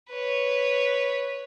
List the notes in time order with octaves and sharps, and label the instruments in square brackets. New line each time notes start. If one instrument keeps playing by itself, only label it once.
[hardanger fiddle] B4 C#5